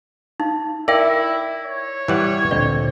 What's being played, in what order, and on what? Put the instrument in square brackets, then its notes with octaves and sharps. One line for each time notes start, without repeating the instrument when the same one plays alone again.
[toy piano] D#4
[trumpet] E4 [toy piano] A#4 E5 G5 [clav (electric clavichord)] D5
[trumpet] C#5
[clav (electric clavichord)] E3 G3 F#5
[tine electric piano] D2 A#2 D3 [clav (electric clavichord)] C4 [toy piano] D5